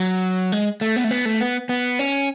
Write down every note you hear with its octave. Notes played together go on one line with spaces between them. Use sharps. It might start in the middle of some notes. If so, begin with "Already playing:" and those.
Already playing: F#3
G#3
A3
B3
A3
B3
A3
B3
B3
C#4